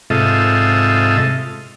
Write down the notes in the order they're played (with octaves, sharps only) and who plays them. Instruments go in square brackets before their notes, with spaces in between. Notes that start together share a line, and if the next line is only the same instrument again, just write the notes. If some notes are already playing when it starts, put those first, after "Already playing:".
[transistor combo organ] G#2 C3 F4 A4 D#5 E5